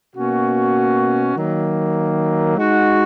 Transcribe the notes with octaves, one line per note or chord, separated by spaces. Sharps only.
B2 A#3 C#4 F#4
D#3 F#3 A#3
G#3 D#4 F#4